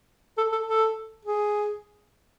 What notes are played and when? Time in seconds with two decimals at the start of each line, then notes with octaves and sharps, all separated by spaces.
0.37 A4
0.52 A4
0.67 A4
1.25 G#4